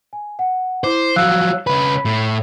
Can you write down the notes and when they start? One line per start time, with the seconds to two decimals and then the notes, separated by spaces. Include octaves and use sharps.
0.13 G#5
0.39 F#5
0.84 E4 C5 D6
1.16 F3 F#3 F5 E6 F#6
1.67 C#3 B4 B5
2.05 A2